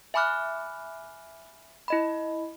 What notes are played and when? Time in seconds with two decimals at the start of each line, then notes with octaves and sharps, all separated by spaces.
0.14 E5 G#5 B5 D6 F6 F#6
1.88 E4 D#5 B5